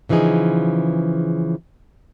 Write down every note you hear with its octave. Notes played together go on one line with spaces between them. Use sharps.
C#3 E3 F3 D#4 G#4